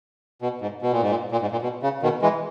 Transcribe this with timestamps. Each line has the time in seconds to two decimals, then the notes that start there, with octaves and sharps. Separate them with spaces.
0.42 B2
0.61 G#2
0.82 B2
0.92 A#2
1.02 G#2
1.10 A#2
1.32 A#2
1.42 G#2
1.52 A#2
1.62 B2
1.83 C#3
2.02 B2 D#3
2.22 E3 G#3